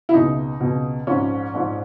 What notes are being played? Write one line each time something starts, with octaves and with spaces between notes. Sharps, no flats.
E4
C#2 B2 D#4
C#2 B2
A#1 G#2 F3 C#4
A#1 G#2 F3